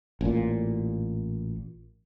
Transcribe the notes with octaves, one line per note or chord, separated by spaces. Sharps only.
A1 A#2